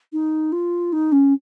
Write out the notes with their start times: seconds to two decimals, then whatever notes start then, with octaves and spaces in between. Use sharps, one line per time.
0.12 D#4
0.52 F4
0.92 D#4
1.12 C#4